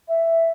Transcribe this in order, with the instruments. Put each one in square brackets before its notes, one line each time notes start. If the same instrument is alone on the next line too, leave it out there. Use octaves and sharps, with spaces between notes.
[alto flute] E5